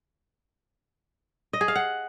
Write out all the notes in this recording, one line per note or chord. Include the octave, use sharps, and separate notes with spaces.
D#5
G#4
F5
F#5